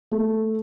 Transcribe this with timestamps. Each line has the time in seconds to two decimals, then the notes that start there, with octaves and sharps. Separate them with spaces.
0.12 A3